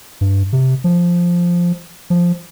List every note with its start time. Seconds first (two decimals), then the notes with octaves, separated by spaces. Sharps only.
0.21 G2
0.53 C3
0.84 F3
2.10 F3